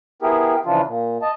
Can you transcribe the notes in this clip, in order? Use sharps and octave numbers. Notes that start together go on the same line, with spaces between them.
B3 E4 G4 G#4 A#4
C#3 E3 F3 D4 F4
A#2
D#5 A5